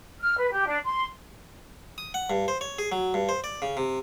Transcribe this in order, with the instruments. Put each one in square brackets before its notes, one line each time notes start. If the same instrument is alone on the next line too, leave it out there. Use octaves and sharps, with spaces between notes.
[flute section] F6
B4
G4
D4
C6
[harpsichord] D#6
F#5
G2
C5
C#5
G#4
F#3
G2
C5
D5
C#3
C3